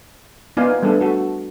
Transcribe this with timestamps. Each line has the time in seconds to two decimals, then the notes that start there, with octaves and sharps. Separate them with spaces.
0.57 B3 D#4 F4 D5 F5 G#5
0.83 G3 A3 B3 D4 A4
1.01 F#4 A4